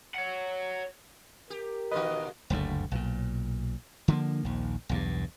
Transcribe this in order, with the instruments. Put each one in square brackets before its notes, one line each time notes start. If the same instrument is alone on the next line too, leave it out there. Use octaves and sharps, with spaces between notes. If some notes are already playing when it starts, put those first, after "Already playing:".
[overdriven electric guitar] C#5 F#5
[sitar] G4 [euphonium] A#4
[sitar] A#2 E3 F#4 [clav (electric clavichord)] D#3 B4 [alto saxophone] D#5
[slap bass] F#1 D2 G2 A3
B1 A#2
D3 F3 A#3
A#1 D#2
B1 E2 G2